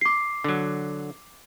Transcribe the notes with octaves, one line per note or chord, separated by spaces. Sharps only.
D6 C7
D3 F#3